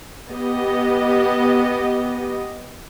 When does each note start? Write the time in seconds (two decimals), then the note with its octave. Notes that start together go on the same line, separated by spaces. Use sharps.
0.30 B3 G4 D#5